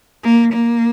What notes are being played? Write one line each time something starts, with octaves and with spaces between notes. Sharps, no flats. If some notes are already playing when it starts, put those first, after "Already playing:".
A#3
A#3